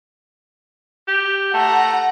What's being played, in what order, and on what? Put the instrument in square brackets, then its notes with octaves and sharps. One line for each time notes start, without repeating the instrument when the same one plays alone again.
[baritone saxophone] G4
[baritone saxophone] A3 [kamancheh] F#5 A#5